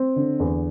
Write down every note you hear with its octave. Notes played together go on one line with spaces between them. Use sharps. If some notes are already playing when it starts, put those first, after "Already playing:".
Already playing: C4
D3
E2